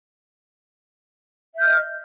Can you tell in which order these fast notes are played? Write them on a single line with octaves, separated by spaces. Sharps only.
E5 G6 F6 D#5